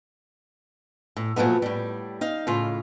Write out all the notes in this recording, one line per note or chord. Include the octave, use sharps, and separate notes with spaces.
A2
A#2 F3 F#3 A3 B3
A2 G3
D#4 F5
A2 C#3 F4